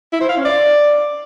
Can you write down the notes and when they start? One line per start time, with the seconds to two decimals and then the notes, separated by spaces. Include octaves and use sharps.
0.13 E4
0.21 C5
0.29 F5
0.37 C#4
0.45 D5